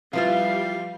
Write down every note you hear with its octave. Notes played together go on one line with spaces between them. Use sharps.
F3 G3 C4 E4 F4 B4 E5 F5